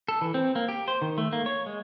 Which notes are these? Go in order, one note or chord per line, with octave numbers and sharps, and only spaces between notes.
A4
E3
C4
A#3
G4
C5
D#3
A3
A#3
C#5
G#3